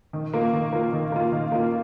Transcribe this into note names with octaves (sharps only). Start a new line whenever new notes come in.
D#3
A#3 F4
D#3
A#3 F4
D#3
A#3 F4
D#3
A#3 F4